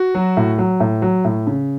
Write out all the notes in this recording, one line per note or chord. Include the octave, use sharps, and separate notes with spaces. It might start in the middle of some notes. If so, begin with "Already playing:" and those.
Already playing: F#4
F#3
A2
F#3
A2
F#3
A2
C#3